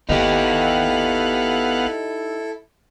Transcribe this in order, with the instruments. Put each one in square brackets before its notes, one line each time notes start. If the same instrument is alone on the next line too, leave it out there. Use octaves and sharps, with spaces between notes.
[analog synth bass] G#1 [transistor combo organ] B3 F5 F#5 [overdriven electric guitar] D#4 G4 [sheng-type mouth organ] E4 A4